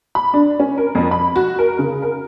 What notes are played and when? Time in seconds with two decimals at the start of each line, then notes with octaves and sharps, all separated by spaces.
0.15 B5
0.34 D4
0.60 C#4
0.78 A#4
0.95 F2
1.11 B5
1.36 F#4
1.59 A#4
1.79 C#3
2.02 A#4